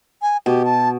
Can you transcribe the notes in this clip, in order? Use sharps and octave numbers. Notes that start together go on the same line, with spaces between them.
G#5
B2 G4
A5